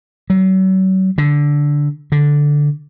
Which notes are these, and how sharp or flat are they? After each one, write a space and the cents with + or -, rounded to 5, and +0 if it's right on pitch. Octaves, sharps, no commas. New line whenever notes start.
F#3 +35
D3 -10
D3 -5